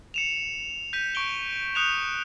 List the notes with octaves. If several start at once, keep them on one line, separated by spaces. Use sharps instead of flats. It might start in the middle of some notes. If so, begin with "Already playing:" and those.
C#7 E7 F7
G6 B6 D#7
C#6 D7 G7
D#6 F#6 G6 C#7 E7 F7